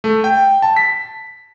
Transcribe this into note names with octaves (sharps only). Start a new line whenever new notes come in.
A3
G5
A5
B6